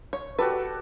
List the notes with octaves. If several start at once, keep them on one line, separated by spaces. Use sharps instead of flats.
C#5
F#4 G4 A4 B4